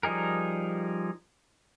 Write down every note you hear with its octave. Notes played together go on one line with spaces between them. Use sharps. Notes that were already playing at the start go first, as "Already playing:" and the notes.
F3 G3 D#4 G#4 A#4